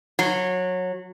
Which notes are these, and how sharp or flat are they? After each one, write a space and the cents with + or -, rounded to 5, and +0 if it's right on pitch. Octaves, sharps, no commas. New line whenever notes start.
F#3 -20